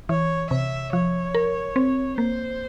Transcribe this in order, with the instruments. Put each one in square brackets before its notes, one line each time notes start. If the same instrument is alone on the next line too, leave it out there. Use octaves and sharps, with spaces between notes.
[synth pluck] E3 [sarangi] C#5
[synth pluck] C3 [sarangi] E5
[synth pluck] F3 [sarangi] C#5
[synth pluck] A#4
C4
[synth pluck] A#3 [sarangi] C5